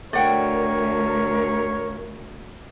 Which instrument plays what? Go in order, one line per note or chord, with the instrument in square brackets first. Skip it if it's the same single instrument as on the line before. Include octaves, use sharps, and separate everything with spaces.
[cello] D2 [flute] A#4 [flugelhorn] C#5 [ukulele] D5 F#5 G5